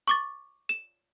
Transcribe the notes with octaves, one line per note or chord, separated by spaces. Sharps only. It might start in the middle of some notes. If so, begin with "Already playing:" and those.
C#6 D6 A6
E7